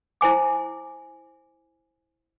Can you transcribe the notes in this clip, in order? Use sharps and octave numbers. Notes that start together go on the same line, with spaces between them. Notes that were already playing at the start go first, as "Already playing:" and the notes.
E4 C5 G#5 D6